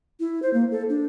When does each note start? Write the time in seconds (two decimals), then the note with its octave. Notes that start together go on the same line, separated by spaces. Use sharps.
0.20 E4
0.42 C5
0.54 A#3
0.72 A4
0.89 D4